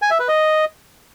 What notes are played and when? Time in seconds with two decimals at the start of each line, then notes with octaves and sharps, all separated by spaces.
0.02 G#5
0.11 E5
0.19 B4
0.28 D#5